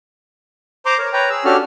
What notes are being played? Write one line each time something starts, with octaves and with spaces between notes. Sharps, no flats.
C5 A#5 C6 D6
A#4 C#5
B4 C#5 G5 A#5
G#4 E6
C#4 D4 F#4 G4 A4 F6